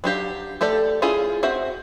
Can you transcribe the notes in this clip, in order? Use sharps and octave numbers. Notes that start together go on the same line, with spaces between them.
F#3 D4 G4 F5
A3 G4 A4 D5
C#4 E4 F4 G#4
C4 F#4 E5